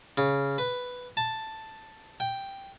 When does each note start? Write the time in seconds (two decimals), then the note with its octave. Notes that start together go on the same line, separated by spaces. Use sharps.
0.18 C#3
0.58 B4
1.17 A5
2.20 G5